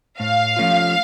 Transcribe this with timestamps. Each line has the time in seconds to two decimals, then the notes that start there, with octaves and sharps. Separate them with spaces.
0.19 A2 F5
0.57 F3 A3 C#4 F4